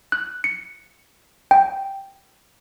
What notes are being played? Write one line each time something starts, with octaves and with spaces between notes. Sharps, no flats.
F#6
C#7
G5